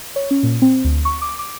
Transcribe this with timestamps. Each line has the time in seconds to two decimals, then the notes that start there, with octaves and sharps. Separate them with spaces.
0.16 C#5
0.31 C#4
0.43 A#2
0.62 C4
0.85 D2
1.05 C#6
1.22 D6
1.39 D6